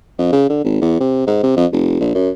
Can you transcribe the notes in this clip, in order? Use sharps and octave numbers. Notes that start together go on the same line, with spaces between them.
F2
C#3
D3
G#1
E2
C3
G#2
C3
F2
F1
A#1
F#2